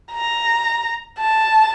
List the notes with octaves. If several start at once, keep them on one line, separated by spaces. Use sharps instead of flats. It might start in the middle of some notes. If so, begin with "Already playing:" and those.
A#5
A5